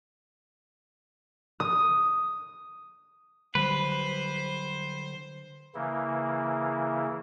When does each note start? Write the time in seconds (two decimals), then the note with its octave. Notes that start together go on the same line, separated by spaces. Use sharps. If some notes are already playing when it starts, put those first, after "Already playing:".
1.60 D#6
3.55 D3 F#3 G3 B4 C5
5.75 C#3 E3 A#3 E4